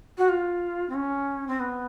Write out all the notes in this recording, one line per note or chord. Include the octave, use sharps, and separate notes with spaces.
F#4
F4
C4
C#4
C4
B3